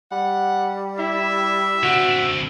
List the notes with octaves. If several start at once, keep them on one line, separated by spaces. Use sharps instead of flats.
G3 F#5
E4 E5
D3 C4 F#4